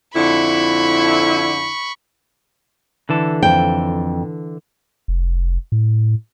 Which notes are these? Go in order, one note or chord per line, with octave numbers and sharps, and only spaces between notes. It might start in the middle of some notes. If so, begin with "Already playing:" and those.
F2 D3 E4 B5 C#6
D3 E3 A4
F2 G5
F1
A2